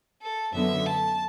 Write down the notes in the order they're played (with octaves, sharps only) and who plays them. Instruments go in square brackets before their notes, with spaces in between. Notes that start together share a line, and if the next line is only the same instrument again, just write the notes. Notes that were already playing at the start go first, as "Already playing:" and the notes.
[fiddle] A4
[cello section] F#2 D3 F#3 B3 [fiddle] E5
[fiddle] A5